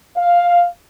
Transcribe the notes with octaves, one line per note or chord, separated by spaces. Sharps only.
F5